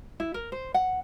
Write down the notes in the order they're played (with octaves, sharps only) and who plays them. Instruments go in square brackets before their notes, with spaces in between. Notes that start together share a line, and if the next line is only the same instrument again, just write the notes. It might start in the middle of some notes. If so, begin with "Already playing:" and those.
[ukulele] E4
A#4
C5
F#5